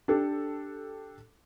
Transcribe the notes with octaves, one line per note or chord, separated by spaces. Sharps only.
D4 G4 A4